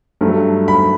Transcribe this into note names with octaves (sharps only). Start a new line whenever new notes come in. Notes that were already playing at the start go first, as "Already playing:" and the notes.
G2 F#3 A3
B5